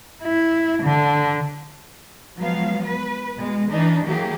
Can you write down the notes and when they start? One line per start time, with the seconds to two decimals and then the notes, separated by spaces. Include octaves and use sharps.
0.24 E4
0.82 D3
2.36 F3 F#3 G#3 B3 F5
2.85 B4
3.37 B2 G#3
3.69 E3 D4 D#4
4.04 E3 F#3 A#3 G4 G#4